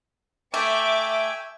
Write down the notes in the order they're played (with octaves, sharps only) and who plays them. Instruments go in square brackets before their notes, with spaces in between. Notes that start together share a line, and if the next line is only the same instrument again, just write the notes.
[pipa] A3 [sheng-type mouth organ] E5 G5 G#5 [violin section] D6